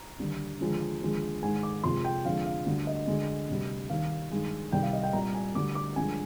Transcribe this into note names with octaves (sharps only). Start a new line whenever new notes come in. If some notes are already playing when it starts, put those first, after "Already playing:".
Already playing: A#5
D#2 D3 G3
D#2 D3 F3 G#3
D#2 D3 F3 G#3
G#2 D#3 G#3 G#5
D6
F2 C3 F3 G#3 C6
G5
F2 D3 F3 G#3 F5
F5
D2 D3 G3
D#5
D2 D3 G#3
D2 C3 G3
D#2 D#3 G3 F5
G2 D#3 G#3
C2 C3 D#3 G3 G5
F5
D#5
G5
C2 A#2 G3 A#5
G#5
D2 D3 G3 D6
D6
G2 D3 F3 G#3 G#5